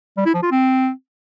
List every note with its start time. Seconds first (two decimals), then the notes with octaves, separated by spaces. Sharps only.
0.17 G3
0.26 E4
0.34 F3
0.43 F4
0.51 C4